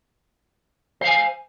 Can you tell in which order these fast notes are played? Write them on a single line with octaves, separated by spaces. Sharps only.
C5 F5 G#5